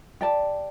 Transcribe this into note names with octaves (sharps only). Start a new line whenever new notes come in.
G4 D5 A5